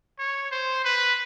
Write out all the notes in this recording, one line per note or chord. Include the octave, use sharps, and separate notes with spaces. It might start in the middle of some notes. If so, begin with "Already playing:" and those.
C#5
C5
B4